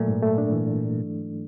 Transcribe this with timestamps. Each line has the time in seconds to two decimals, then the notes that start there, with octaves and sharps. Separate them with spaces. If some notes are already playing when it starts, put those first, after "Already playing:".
Already playing: A#2 F#3 A3
0.08 G#2
0.22 A3
0.38 D4
0.52 E3